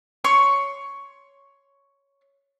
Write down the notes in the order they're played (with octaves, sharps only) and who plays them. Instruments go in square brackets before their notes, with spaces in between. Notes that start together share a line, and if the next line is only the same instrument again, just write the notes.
[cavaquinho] C#5 C6 C#6